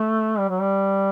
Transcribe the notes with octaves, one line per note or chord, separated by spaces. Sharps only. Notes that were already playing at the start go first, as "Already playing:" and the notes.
Already playing: A3
G3
F#3
G3